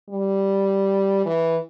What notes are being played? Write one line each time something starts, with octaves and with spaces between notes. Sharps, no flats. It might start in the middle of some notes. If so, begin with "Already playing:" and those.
G3
E3